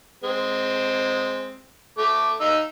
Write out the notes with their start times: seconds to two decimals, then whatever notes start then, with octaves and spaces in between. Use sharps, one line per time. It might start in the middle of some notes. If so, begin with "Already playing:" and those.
0.24 G#3 C4
1.98 A3 D6
2.41 D#4 E6